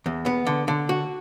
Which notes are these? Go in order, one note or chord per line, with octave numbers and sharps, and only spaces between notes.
E2
B3
D3
D3
F#4